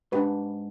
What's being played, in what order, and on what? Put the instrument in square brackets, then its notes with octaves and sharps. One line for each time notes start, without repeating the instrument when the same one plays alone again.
[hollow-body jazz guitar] G#2 [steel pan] D4 G4 B4